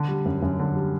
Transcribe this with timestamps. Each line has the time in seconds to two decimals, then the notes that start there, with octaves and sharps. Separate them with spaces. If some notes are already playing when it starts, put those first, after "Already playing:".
Already playing: D3
0.08 G3
0.25 F#2
0.42 F#2
0.59 D3
0.76 G3